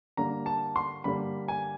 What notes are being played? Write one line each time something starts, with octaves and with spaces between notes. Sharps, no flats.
D3 G3 A#3 D4 A#5
A5
C6
D3 G3 A#3 D4 B5
G#5